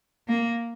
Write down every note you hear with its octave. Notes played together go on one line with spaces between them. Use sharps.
A#3